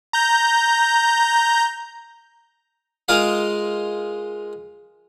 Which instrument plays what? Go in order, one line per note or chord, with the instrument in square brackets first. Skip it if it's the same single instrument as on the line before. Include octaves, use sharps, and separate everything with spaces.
[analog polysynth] A#5 G6
[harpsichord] G#3 F4 A#4 D#5 F5